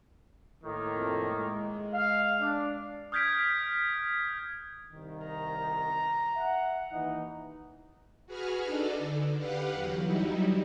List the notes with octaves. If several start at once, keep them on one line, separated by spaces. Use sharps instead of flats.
A2 D#3 A#3
F2 A3
G#3
F5
D4
D#6 F6 G6 G#6 B6 D7
C2 D#3
A#5
E5 F#5
D#2 E3 D#4
F#4 G#4 B4 F6
D4 D#4 A4 D5
D3
G4 B4 F5 F#5
E2 F#3
F#3 G3 D#4 E4